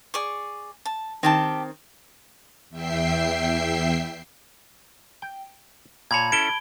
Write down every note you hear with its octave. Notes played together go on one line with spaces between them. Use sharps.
G#4 D5 C#6
A5
D#3 C4 G4 G5 A5
E2 E5 G5 C7
G5
A#2 C#5 A5 B5 G#6
C#4 E4 A4 D7 G7